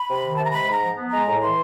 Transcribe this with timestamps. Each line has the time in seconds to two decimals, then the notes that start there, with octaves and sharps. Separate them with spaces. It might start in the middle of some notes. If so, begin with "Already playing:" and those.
Already playing: B5
0.08 C3
0.22 D#3
0.38 C3 A5
0.45 A#5
0.52 G#3 B5
0.68 G#2 A#5
0.82 F3
0.97 B3
1.11 G#3 A#5
1.27 A2
1.41 E3 C6